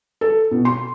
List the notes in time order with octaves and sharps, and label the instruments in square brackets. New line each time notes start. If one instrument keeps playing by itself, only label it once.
[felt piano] A4
B2
C6